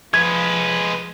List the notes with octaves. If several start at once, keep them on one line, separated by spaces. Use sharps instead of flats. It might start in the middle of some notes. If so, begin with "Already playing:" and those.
F3 G#3 B4 G#6